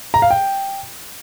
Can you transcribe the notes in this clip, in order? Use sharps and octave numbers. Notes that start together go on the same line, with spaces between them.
A#5
F5
G5